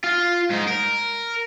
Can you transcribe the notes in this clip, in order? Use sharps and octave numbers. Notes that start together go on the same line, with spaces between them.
F4
G#2 D#4
A#4